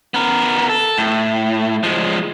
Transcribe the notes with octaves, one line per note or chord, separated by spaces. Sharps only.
B3 A#4
A4
A2
F3 G#3